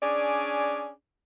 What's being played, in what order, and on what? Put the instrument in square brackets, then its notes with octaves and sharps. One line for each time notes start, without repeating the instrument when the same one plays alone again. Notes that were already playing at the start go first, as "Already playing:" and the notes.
[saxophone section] C#4 D4 G#4 D5